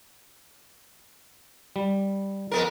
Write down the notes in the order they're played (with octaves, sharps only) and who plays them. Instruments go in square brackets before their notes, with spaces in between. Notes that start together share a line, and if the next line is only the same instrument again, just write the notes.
[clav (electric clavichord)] G3
[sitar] F2 B3 A#4